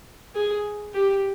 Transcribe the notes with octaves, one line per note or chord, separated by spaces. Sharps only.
G#4
G4